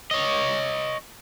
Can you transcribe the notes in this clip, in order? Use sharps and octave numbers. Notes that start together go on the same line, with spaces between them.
C#5 D#5